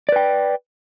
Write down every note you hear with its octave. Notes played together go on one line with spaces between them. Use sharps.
B4 D5 G5